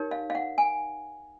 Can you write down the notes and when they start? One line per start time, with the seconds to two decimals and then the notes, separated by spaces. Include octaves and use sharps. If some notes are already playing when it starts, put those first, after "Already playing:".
Already playing: D#4 G4 A#4 C#5
0.11 F5
0.30 F5
0.35 F#5
0.58 G#5